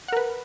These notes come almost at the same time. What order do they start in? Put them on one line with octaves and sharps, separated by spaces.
F#5 A#4 B4